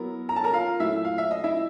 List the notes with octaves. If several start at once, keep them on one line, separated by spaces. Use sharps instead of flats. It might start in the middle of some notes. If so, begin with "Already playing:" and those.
Already playing: F#3 B3 E4 A#4
A#5
A5
A#4 A#5
F4 F5
A#2 F#3 A3 E4 E5
F5
E5
D#5
E4 E5